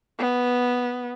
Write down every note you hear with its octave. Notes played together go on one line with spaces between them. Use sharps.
B3